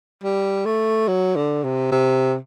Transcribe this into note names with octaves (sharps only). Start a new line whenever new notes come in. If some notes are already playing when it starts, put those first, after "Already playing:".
G3
A3
F#3
D3
C3
C3